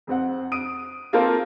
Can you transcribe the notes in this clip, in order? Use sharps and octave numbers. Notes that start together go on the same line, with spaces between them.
F2 C4 F#5
D#6 D7 D#7
A#3 C4 F4 A4 A#4 C5